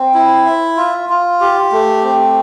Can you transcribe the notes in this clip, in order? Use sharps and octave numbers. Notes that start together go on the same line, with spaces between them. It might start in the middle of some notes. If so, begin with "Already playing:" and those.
Already playing: C4
E4
E5
F4
F4
G4
A3
C4